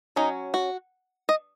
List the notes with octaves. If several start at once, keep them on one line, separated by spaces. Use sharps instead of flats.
F#3 C#4 D#4
F#4
D#5